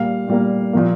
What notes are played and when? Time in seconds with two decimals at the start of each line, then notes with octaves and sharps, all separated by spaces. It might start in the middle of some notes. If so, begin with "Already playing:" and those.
Already playing: A#2 G3 A#3 F5
0.27 A#2 G3 A#3
0.73 A#2 F3 A#3